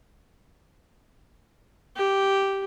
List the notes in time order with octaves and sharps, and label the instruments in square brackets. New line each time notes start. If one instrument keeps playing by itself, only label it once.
[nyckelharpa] G4